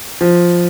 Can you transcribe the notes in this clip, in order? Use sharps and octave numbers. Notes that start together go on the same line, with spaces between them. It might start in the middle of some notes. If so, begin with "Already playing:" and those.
F3